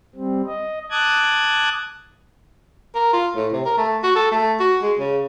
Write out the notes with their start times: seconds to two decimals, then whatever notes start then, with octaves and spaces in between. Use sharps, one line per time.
0.15 G3 C4
0.47 D#5
0.91 A5 D6 D#6 F#6 G#6
2.95 A#4
3.13 F4
3.36 A2
3.53 C3
3.65 A#4
3.77 A3
4.03 F#4
4.15 A4
4.31 A3
4.60 F#4
4.82 G#3
4.99 C#3